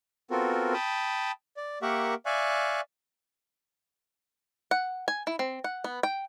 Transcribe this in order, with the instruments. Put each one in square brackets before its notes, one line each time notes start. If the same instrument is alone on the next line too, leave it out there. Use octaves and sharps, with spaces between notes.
[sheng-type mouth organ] B3 C4 F4 F#4 A4 A#4
G5 A5 B5 D#6
D5
A#3 G4 A#4 E5 F#5 C#6
D5 E5 F5 G#5 C#6 F#6
[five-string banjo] F#5
G#5
E4
C4
F#5
B3
G5